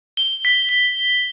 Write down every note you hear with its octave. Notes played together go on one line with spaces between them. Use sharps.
G7
B6
G7